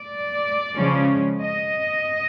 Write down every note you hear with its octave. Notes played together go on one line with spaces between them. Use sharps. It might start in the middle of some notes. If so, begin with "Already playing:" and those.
Already playing: D5
C#3 F3 G#3 C#4
D#5